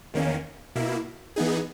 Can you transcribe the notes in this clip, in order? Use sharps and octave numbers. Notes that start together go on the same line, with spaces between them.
E2 D#3 A#3 C#4
B2 A#3 E4
E3 B3 D#4 G#4